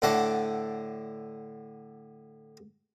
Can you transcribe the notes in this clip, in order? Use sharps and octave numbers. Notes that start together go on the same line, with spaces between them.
A2 D3 A4 F#5 D6